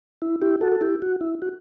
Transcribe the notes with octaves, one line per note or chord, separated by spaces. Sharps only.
E4
E4 G4
F#4 A4
A4
E4 G4
F#4
E4
F#4